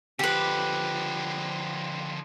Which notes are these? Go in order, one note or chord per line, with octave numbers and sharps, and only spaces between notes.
D3 F3 G4 B4